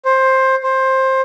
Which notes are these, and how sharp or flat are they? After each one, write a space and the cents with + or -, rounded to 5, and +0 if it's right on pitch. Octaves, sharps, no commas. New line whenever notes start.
C5 +15
C5 +15